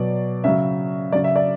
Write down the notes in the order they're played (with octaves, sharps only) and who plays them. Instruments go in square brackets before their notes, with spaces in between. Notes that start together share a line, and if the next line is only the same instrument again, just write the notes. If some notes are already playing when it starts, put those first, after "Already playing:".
Already playing: [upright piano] B2 F#3 D5
C#3 F#3 E5
C#3 F#3 D5
E5
D5